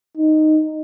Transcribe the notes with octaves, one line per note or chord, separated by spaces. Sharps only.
D#4